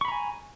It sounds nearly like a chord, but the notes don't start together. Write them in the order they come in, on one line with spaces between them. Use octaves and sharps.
C#6 B5 A#5 G#5